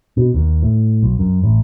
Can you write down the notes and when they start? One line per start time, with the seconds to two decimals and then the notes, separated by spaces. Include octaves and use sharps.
0.17 B2
0.34 D#2
0.63 A2
1.03 B1
1.19 F#2
1.44 A1